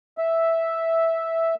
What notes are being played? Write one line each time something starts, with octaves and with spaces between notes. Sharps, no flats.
E5